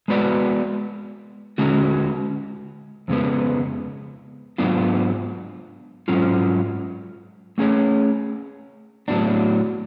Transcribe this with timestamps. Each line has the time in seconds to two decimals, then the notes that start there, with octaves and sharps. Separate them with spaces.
0.08 G#3 B3 F#4 B4 D5
1.58 D3 G#3 C#4 F#4
3.08 F2 C#3 G#3 B3
4.58 G#2 F#3 B3 D4 F4
6.08 G#2 F#3 C#4 F4
7.58 A3 C#4 G#4 C#5
9.08 A2 F#3 B3 D4